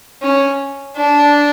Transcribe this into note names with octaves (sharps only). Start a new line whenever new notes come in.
C#4
D4